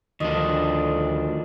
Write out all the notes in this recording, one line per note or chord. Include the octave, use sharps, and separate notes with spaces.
D2 D#3 F3 D4 D#5